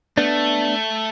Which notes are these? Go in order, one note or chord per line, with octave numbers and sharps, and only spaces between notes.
A3 B3 D4